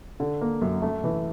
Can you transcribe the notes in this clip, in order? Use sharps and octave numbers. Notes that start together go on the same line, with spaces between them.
D3
A#3
F#2
A3
E3